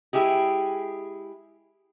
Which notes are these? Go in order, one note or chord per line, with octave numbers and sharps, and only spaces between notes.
G#3 E4 G4 G#4